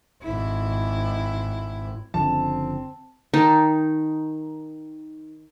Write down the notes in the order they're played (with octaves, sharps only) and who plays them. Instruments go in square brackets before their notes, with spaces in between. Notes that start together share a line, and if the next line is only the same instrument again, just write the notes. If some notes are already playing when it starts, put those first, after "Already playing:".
[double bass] G#1 E4
[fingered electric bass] F#1 D3 F3 [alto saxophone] C4 [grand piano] A5
[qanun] D#3 D#4 A5